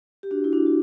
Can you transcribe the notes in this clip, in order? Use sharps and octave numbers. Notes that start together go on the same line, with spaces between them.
G4
D4 F#4
E4
D4 F#4
F#4